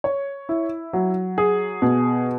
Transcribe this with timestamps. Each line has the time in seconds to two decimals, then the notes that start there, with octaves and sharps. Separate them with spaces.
0.04 C#5
0.49 E4
0.93 F#3
1.38 G#4
1.82 B2